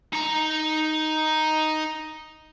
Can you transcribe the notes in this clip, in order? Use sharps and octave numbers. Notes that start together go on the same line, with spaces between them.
D#4 A#5